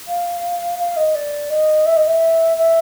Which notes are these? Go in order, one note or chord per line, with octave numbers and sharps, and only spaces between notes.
F5
F5
D#5
D5
D#5
E5
D#5
E5
E5